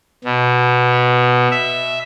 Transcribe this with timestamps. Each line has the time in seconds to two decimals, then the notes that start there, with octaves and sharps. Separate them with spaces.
0.24 B2
1.51 E5